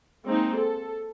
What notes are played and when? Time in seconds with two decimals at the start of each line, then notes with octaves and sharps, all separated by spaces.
0.25 G#3 A#3 C4 D#4
0.56 A4